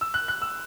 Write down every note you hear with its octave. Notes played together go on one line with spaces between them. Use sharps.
E6
F#6
F#6
E6